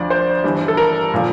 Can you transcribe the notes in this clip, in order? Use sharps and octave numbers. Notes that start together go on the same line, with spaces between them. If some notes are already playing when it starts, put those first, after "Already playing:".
Already playing: D2 D3 F3 D5
C5
G1 G2 E3
A4
A#4
A#2 F3